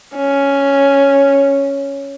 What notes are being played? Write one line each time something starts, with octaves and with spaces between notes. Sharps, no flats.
C#4